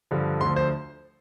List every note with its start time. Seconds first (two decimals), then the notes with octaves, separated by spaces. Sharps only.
0.11 G2 D3 F3
0.41 D2 D3 F3 C6
0.56 C5